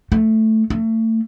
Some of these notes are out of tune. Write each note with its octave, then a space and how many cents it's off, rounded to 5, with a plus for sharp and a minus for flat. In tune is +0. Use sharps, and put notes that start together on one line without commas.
A3 +0
A3 +30